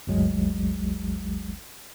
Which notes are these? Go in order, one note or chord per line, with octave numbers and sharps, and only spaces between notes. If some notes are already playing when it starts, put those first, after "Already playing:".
G1 D2 F#3 G#3